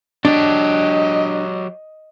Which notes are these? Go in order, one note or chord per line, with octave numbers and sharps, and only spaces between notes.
F#3 D4 G4 D#5